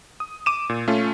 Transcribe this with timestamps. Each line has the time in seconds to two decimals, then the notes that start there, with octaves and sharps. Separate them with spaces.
0.20 D#6
0.46 D6 D#7 E7
0.69 A#2
0.88 A3 C#4 F4